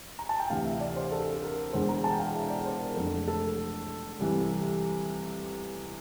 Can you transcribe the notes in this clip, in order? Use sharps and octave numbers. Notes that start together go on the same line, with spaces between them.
A#5
A5
G5
D2 C3 E3 F5
E5
D5
C5
A4
A#4
E1 E2 D3 C5
A#5
A5
G5
F5
E5
D5
C5
A#4
F1 F2 D3 A4
A4
C2 C3 E3